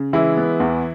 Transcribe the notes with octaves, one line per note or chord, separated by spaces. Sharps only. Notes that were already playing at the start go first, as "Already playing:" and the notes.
Already playing: C#3
E3 G#3 E4
B3
E2